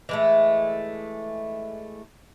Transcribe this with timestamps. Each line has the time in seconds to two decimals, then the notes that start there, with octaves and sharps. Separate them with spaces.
0.09 E3 G#3 A3